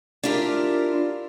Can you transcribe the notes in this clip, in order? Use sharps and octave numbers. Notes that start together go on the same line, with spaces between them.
D4 E4 F4 G4 A#4